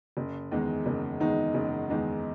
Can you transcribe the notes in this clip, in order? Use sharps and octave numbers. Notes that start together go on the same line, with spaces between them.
F#1
E2 D#3 G#3 D#4
F#1
E2 D#3 G#3 D#4
F#1
E2 D#3 G#3 D#4